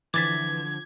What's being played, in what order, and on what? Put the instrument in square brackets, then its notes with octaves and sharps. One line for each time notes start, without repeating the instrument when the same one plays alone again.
[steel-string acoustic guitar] F2 D3 F3 [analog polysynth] E3 [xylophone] D6 A6 B6 [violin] G#6